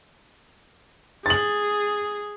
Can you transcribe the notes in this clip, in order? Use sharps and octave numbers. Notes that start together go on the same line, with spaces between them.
G#4 A6 F#7